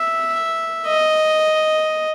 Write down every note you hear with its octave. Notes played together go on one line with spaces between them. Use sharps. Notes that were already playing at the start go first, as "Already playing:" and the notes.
Already playing: E5
D#5